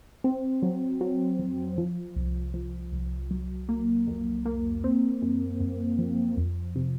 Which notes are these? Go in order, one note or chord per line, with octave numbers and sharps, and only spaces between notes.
C4
F#3
F#3
F2
F3
C2
F3
C2
F#3
A#3
F2
A#3
C4
F#2
F#2
F3
F2
C3